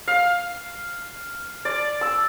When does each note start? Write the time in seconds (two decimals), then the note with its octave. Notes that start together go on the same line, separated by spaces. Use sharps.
0.08 F5
1.65 D5
2.01 E6